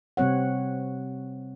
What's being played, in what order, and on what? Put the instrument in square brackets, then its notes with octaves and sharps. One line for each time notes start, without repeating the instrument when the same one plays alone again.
[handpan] C3 G3 C4 C#5 F#5